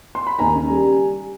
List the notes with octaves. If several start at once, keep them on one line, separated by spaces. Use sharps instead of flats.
C6
B5
D#2 G#5 A#5
C#3
G3